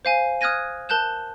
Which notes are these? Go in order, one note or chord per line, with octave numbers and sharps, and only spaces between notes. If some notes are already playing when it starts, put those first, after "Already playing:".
C5 F5 G#5
D#6 F6 F#6 G#6 A#6 D#7
A#4 A5 F#6 G6 E7